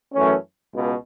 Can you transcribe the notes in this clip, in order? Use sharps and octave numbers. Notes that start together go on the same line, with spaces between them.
F#2 E3 A3 C#4
C#2 B2